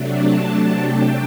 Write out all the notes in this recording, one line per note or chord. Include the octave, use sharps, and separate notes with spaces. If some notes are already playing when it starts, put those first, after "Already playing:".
Already playing: C3 F#3 A3 D4
A5
A5
G5